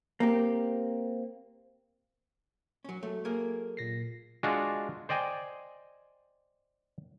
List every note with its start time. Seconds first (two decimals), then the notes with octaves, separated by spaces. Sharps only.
0.20 A#3 C4 G4
2.84 F#3 C#4
3.03 F#3 A3 A4
3.25 A#3 G#4 A#4
3.77 A#2 A#6 C7
4.43 G#3 D4 F4 F#4
5.09 C5 D5 D#5 G5 G#5